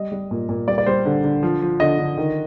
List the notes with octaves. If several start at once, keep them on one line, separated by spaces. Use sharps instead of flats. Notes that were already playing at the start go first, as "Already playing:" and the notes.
Already playing: G3 D#5
G3
A#2
A#2
G3 D5
D5
G3 C5
D3
D3
F3
F3
D3 D#5
D3
D#3